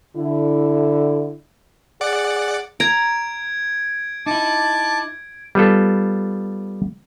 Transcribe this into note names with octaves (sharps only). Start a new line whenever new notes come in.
D3 E4
G#4 D5 F#5 D6
A#5 G#6 D7
D#4 E4 A5 D6
G3 B3 F4 A4